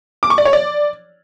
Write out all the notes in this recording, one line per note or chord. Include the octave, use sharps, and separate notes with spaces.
D6
C#6
D5
C#5
D5